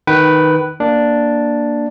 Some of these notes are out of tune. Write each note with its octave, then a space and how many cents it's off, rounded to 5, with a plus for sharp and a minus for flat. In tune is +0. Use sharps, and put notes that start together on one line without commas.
D#3 +0 B4 +0 G5 -35
A#3 +0 D4 +0